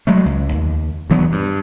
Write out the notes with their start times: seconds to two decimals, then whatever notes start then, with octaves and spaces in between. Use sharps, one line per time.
0.07 F#3 G#3 A3
0.25 C#2
0.53 D#2
1.10 D2 E3 F#3 B3
1.32 G2